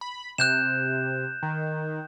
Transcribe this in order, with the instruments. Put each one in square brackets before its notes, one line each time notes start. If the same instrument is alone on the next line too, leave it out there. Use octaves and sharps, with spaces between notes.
[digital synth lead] B5
[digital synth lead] C3 [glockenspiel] F#6 G6 E7
[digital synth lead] D#3